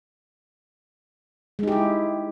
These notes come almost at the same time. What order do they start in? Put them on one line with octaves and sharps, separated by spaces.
G#3 D#4 G4 E4